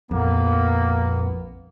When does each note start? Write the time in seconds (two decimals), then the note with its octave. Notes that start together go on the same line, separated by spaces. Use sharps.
0.11 A#1 F2 A#3 B3